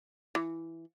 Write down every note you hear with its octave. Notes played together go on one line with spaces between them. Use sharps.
E3